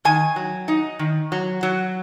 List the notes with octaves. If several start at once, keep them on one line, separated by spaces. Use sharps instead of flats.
D#3 G#5
F#3
D#4
D#3
F#3
F#3